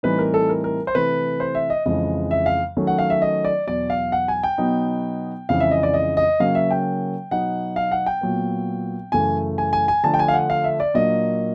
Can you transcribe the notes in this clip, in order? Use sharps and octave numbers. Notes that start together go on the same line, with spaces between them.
A2 E3 G3 C4 D#4 B4
A#4
A4
A#4
A#4
C5
C3 E3 A3 B4
C5
E5
D#5
F2 C#3 E3 G#3 D#5
E5
F5
D#3 F#3 A3 C#4
F#5
F5
E5
D#5
D5
E2 B2 F#3 D5
F5
F#5
G#5
G5
B2 F#3 B3 D#4
F2 C#3 E3 G#3 F5
E5
D#5
D5
D#5
D#5
C#3 F#3 A#3 C#4 F5
E5
G5
B2 F#3 B3 D#4 F#5
F5
F#5
G5
A#2 F#3 B3
F#2 C#3 E3 A3 G#5
G#5
G#5
G#5
D3 F3 A3 D4 A5
G5
G#5
F5
F#5
F5
E5
D5
A#2 F#3 A#3 D4 D#5